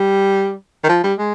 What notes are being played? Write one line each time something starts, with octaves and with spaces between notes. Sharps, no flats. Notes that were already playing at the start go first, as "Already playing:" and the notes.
Already playing: G3
D#3
F3
G3
G#3